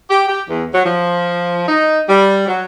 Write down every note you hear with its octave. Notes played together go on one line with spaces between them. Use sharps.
G4
G4
E2
F#3
F3
D#4
G3
F#3